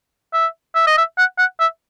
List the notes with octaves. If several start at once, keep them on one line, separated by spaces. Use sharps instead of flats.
E5
E5
D#5
E5
F#5
F#5
E5